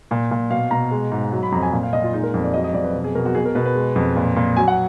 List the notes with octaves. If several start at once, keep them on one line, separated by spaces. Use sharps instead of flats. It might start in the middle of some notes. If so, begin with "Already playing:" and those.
A#2
A#2
B2 F5
B2 A#5
G#3
G#2
F#3
B5
F2 A#5
G#5
A#2
F5
A#2 D#5
F4
G#3 D#4
A#4
F2
D5
F#3 D#5
D#5
F2 D5
B4
B2
G#4
B2 A#4
F#4
B2 G#4
A#4
B2 B4
B4
G#3
F2
A#2
A#2
F#3 G#5
F#5